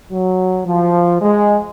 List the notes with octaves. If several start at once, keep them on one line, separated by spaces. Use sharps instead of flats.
F#3
F3
G#3